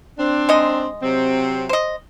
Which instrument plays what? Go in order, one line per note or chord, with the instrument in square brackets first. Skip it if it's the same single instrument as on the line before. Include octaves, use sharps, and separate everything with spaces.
[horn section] C4 D4
[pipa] G#3 D#4 D#5
[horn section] C3 F#3 C4
[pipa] C5 D#5